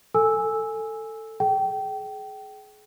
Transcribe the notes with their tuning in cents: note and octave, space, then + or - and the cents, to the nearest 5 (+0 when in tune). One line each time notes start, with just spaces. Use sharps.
A4 +15 G#5 +0 E6 -5
G#4 +30 G5 -25